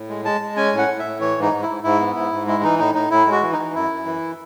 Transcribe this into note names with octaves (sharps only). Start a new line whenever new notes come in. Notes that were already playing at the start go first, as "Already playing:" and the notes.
Already playing: A2
G#3
G#3 A5
G#3
C#4 G#5
A2
F#5
A2
E5
A2
E3 C#5
G#2
D#4
G#2
E4
G#2
G#2 E4
B3
G#2 E4
G#2
G#3 E4
E3 D#4
A2 D#4
A2 D#4
A2 E4
G#3
F#4
E3
D#4
E3
F#2 E4
F#2
E3